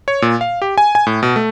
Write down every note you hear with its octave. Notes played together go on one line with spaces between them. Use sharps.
C#5
A#2
F5
G4
G#5
G#5
A2
B2
A3